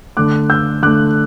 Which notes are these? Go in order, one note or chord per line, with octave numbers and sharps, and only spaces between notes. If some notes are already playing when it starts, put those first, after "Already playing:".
D3 A3 D6 F#6
E6 G6
D3 A3 D6 F#6